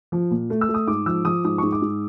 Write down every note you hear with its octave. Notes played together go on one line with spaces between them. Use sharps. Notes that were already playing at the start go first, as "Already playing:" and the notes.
F3
A#2
A3
E6
A3
D#6
G#2 D6
F3 E6
F3 D#6
G#2 D#6
G#2 C#6
D6
G#2